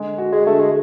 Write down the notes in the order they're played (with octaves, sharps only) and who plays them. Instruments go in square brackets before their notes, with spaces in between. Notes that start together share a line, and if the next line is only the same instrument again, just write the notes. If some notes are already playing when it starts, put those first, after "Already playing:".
Already playing: [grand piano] D3 G#3
F#4
[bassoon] G#3
[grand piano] D3 [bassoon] A3
[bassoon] G#3